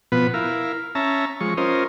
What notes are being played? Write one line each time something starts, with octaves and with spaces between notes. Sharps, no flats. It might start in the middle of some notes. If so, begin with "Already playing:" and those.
B2 F3 B3 B4
E4 A#4 F5
C#4 E5 A5 A#5
F3 G#3 C#6
C#4 F4 A#4 C5 D#5